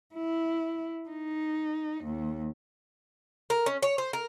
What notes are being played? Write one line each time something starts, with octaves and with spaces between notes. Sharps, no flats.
E4
D#4
D#2
A#4
C#4
C#5
C5
A#4